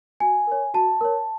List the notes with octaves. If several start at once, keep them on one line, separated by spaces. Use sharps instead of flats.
F#4 G#5
A#4 C#5
F#4 A5
A#4 C#5